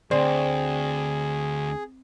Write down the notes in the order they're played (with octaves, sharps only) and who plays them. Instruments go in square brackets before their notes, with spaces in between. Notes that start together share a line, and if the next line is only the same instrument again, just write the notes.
[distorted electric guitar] D2 [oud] C4 [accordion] G#4 [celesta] D5